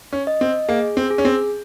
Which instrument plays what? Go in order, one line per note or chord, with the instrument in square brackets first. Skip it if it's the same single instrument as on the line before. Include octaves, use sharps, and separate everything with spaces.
[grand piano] C#4
[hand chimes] D#5
[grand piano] C4
[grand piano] A#3 [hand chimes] G#4
[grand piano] C4
[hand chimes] G#4
[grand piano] C#4
C4